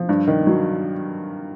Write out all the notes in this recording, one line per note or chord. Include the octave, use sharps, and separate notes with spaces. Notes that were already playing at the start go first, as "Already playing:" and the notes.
Already playing: F3
G2
D#3
F#3